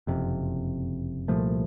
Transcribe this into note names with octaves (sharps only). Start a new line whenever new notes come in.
F#1 F2 C3
C2 A#2 F3 A3